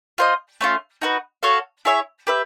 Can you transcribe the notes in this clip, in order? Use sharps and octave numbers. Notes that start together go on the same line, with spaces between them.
F4 A4 C5 D#5
A3 C#4 F4
D#4 F#4 B4
F#4 A4 C#5 F5
E4 G#4 C#5 E5
G4 B4 E5